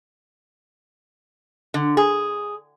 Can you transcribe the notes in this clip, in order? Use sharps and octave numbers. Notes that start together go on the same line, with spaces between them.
D3
G#4